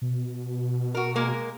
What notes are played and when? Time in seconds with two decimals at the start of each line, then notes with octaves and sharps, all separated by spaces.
0.02 B2
0.94 F#4 A#4
1.15 G#3 A#3 A#4